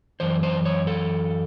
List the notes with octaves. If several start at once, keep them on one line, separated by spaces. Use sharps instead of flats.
F#2 E3 C5
C5
C#5
A4